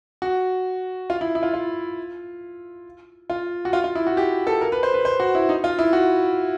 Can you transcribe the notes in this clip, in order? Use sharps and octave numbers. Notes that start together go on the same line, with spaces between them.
F#4
F4
E4
E4
F4
F4
F4
F#4
F4
F4
E4
F#4
G4
A4
A#4
B4
C5
B4
C5
F#4
E4
D#4
F4
E4
F#4